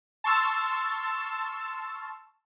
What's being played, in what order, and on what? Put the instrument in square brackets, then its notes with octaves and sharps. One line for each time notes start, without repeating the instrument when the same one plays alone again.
[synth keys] A5 C6 C#6 E6 F6 A6